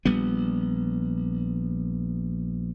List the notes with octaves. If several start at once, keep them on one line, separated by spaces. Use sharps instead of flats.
A#1 G3 B3